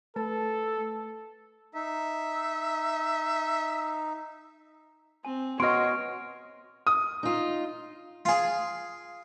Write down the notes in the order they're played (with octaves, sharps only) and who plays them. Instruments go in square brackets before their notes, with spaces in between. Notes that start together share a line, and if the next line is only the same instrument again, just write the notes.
[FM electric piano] A3 B4 A5 [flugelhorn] A4
[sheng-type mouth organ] D#4 [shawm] E5
[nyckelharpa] C4 [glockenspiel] G#5
[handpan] B3 F#4 [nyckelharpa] C#5 [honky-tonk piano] D#5 C6 [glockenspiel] F6 D7
[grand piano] D#6
[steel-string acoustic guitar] D#4 F4
[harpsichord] F4 G#4